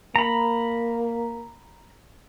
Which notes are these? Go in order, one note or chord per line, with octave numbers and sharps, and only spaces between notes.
A#3 A#5 B5